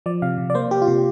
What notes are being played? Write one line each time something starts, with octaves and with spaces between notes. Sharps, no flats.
F3 D5
C3 F5
C3
D5
A#3 C5
A#3 G4
F4
C3 G4